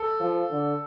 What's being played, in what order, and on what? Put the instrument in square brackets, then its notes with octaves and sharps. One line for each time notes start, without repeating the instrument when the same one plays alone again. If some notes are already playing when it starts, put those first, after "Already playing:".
Already playing: [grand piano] A4
[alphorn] F3
D3